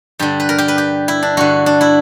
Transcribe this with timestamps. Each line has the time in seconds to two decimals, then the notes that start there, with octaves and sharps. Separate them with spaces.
0.19 G2 D3 G4
0.40 B4
0.49 A#4
0.58 G4
0.68 B4
0.78 G4
1.08 E4
1.23 D4
1.37 G2 D3 F#4
1.66 D4
1.81 E4